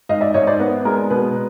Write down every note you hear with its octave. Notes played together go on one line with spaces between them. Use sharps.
G#2 D#5 F5
D5 E5
G#2 C#5 D#5
C5 D5
B3
G#3 A#4
B2 B4